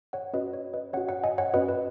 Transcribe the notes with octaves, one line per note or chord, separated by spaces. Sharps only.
C#5 F#5
C#4 F#4 B4 D#5
C#5
B4 D#5
C#4 F#4 C#5 F#5
C#5 F#5
D#5 G#5
C#5 F#5
C#4 F#4 B4 D#5
B4